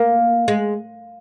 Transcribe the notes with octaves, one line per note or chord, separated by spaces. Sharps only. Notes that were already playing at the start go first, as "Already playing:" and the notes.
Already playing: A#3
G#3